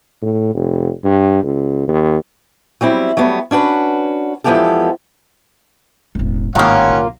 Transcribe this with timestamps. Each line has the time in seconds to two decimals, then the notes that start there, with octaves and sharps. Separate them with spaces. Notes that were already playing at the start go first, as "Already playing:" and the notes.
0.22 A2
0.54 F1
1.04 G2
1.43 C#2
1.88 D#2
2.81 F#3 G3 C4 E4
3.17 F#3 G3 A3 B3
3.51 C#4 D4 F#4 B4
4.44 E2 F3 G#3 B3 G4 A4
6.15 E1 A1
6.55 G#1 A2 D#3 G3 A#3 C#4 F4 F#5
6.89 B1